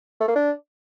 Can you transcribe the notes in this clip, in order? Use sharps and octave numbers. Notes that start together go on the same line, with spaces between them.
A3
A#3
D4